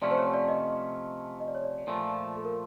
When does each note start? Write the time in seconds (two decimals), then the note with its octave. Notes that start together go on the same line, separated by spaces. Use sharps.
0.02 C3 F3 A3 C#4 D5
0.11 C5
0.18 C#5
0.33 D5
0.48 D#5
1.40 D#5
1.48 D5
1.55 C#5
1.63 D5
1.87 A#2 F3 A3
2.37 A4
2.45 A#4